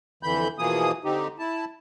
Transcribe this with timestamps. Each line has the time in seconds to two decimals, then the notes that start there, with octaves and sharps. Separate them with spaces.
0.23 F2 D3 E3 B5 G6
0.59 B2 E3 F3 A#3 G#4 D#6
1.04 D3 C4 D#4 G4
1.39 E4 A5